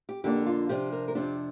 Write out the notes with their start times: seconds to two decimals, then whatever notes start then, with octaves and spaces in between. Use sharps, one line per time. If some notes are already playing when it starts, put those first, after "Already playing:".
0.09 G4
0.24 F2 D3 A#3 D4 G4
0.46 F4
0.69 C3 F3 D4 G4
0.92 A#4
1.08 A#4
1.15 F2 C3 F3 D4 G4